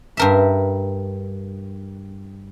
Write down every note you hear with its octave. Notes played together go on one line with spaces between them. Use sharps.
G2 A#4 E5